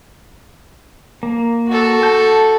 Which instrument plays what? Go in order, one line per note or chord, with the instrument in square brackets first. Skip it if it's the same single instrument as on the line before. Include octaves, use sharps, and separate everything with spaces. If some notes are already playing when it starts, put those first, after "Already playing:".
[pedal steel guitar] A#3
[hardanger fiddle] F#4 A4
[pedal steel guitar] A5 G6